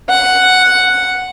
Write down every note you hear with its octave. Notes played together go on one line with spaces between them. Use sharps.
F#5